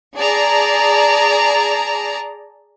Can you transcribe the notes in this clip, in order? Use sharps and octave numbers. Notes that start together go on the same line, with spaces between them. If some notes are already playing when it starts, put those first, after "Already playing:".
G#4 D5 A5 A#5